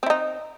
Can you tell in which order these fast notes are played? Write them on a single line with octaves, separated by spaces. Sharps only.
C4 E4 D#4